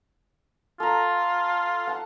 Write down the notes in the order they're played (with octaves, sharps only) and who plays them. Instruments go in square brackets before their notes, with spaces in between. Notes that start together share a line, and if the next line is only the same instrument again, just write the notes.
[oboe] F4 [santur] A4 A#5
[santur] F#5 A5